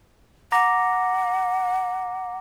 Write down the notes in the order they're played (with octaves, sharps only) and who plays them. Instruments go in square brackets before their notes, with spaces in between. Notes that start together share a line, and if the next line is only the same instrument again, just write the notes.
[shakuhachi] F#5 [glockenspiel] A#5 D6 A#6